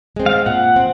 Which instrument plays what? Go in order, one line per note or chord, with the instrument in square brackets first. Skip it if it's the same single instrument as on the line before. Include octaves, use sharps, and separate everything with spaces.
[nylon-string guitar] G#3 C4
[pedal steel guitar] F5
[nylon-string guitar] A#2 [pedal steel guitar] F#5
[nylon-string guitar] C4